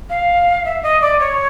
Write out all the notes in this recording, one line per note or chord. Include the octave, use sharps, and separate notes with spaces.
F5
E5
D#5
D5
C#5